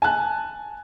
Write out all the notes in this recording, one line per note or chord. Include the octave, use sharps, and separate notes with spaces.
G#5 A5 F#6